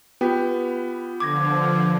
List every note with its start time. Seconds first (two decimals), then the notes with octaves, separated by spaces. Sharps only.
0.21 B3 F4 G4 B4 G5
1.20 D3 F3 D6 G#6 A#6